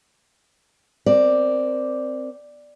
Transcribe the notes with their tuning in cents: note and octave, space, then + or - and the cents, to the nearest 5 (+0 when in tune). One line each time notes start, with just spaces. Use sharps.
C4 +0 A#4 +0 D5 +0